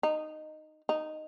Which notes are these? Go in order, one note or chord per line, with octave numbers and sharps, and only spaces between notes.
D#4
D#4